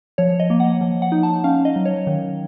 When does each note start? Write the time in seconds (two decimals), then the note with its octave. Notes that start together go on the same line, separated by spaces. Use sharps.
0.18 F3 C#5
0.40 D#5
0.50 A#3
0.60 F#5
0.81 F3
1.02 F#5
1.12 D#4
1.23 A5
1.44 C#4 F5
1.65 D#5
1.76 F#3
1.85 C#5
2.07 D#3